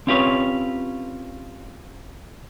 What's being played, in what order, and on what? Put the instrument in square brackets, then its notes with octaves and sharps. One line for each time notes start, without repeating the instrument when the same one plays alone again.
[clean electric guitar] C4 C#4 F4 G4 B4 C#5